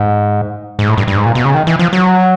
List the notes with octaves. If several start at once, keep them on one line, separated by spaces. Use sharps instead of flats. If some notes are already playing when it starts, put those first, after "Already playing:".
Already playing: G#2
G#2
A2
G2
G2
G#2
A#2
B2
C#3
D#3
E3
F3
F#3